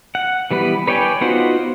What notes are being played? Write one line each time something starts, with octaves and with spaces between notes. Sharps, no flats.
F#5
E3 G3 B3 B4
B4 C#5 D5 G5 G#5
B3 D#4 F4 F#4 C5